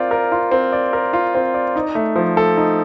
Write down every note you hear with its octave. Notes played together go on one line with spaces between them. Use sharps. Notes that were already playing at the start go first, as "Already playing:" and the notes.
Already playing: C4 F4 A#4 D5
A#4
F4
C4
D5
A#4
F4
C4
D5
D#4
A3
F3
A4
D#4